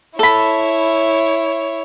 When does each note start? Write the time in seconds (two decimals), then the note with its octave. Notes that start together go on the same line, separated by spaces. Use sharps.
0.19 E4 A4 C#5 B5